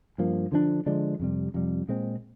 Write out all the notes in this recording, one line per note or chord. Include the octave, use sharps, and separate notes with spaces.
G2 F3 A#3
D3 F3 G#3 D4
D3 F3 G#3 D4
F2 C3 G3
F2 C3 G3
A#2 G#3 C4